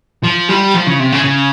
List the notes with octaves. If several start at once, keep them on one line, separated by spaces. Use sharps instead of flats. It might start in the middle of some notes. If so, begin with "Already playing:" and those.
F3
G3
F3
C#3
C3
C#3
C#3